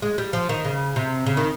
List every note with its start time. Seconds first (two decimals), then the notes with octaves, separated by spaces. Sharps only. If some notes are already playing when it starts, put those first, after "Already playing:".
0.02 G#3
0.18 G3
0.33 F3
0.49 D#3
0.65 C#3
0.96 C3
1.26 C#3
1.37 D#3